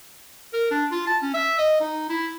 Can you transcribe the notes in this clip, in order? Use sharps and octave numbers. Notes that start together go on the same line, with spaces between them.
A#4
D4
F4
A5
C#4
E5
D#5
D#4
E4